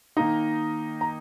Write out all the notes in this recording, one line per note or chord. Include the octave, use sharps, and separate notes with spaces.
D#3 A#3 D#4 A#5
A#5